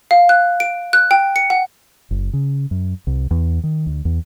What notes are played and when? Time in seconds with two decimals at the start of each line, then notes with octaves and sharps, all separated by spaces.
0.11 F5
0.29 F#6
0.60 D7
0.93 F#6
1.11 G5
1.36 C#7
1.50 F#5
2.11 F#1
2.33 C#3
2.71 F#2
3.07 C2
3.31 E2
3.64 D#3
3.86 D2
4.05 E2